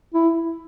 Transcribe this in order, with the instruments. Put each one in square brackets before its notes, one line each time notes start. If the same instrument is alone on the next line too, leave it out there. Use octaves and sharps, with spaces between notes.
[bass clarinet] E4